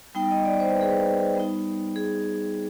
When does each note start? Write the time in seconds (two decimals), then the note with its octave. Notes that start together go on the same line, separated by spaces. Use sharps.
0.15 G3 B3 D#4 G5
0.31 D#5
0.45 D5
0.60 C5
0.71 B4
0.81 G#4
0.91 B4
1.35 G3 B3 D#4
1.96 G#4